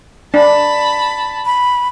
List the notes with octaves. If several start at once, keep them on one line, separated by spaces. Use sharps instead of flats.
D4 A5 B5
B5